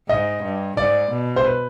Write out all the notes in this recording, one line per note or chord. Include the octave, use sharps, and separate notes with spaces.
G#2 D#5
G2
G#2 D5
B2
C5
B4